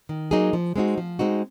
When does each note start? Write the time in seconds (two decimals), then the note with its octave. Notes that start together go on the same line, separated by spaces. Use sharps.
0.09 D#3
0.31 F#3 A#3 D#4 G#4
0.53 F3
0.76 G#3 C4 D#4 F#4
0.98 F3
1.19 G#3 C4 D#4 F#4